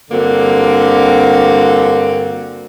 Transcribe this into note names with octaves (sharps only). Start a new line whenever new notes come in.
G2 D3 A#3 C4 F#4